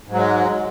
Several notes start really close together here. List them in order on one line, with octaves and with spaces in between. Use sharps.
G#2 F#3 G#3